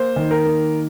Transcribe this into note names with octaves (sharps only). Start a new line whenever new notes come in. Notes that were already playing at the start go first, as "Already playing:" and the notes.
Already playing: A#3 C5
D#3
A#4
A#3